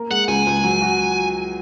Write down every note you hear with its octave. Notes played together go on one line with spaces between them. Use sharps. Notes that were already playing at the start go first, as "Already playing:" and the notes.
Already playing: A#3 A#4
G#3 F#5
C#2 G#5
C#2
F#3
F#4